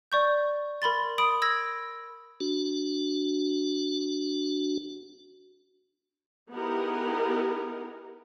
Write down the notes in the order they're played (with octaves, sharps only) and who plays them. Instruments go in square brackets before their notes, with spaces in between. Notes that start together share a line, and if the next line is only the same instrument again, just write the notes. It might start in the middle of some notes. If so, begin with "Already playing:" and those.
[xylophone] D5 C#6 G6
A#4 B5 C6 A6
B5 D#6 D7
E6 G#6 A#6
[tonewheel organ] D4 F#4
[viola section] B3 D#4 E4 G4 G#4 A#4